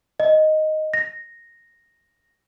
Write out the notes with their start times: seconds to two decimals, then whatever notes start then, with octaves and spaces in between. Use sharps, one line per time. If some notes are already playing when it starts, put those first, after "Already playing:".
0.20 D#5
0.94 A#6